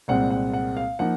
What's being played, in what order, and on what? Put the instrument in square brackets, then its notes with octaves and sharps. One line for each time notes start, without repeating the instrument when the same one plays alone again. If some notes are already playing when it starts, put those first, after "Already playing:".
[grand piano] C2 A#2 G#3 C4 F#5
F#5
F#5
F5
F3 A#3 D#4 F#5